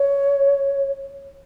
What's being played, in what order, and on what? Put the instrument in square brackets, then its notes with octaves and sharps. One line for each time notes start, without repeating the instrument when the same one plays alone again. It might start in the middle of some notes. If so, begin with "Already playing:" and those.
Already playing: [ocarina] C#5